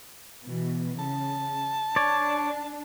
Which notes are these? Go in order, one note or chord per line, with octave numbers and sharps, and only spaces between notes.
B2 E3
C#3 A5
D4 C#5 D5